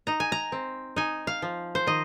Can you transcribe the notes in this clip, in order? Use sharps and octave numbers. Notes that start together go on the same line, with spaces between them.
D#4 A#5
G#5
A#5
C4
D#4 G#5
F5
F3
C5
D#3 D#5